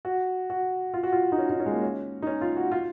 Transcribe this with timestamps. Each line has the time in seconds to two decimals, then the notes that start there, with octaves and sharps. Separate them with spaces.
0.05 F#4
0.50 F#4
0.94 F4
1.03 F#4
1.13 F4
1.32 D#4
1.38 C#4
1.50 D#4
1.60 C#4
1.66 G#3
1.72 A#3
1.82 C#4
2.22 D#4
2.27 C#4
2.41 F4
2.57 F#4
2.71 F4